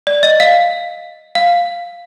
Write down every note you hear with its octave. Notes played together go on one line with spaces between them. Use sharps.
D5
D#5
F5
F5